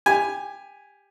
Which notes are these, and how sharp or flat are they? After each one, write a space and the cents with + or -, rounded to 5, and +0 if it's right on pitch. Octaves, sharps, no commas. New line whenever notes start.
G4 +20 G#5 +0